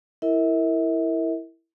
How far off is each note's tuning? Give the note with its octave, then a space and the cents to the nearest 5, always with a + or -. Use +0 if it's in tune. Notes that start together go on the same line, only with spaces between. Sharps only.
E4 +0 A#4 -20 E5 -40